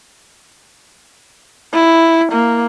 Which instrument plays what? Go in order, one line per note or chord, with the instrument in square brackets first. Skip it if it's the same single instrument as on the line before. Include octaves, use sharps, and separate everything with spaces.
[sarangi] E4
A#3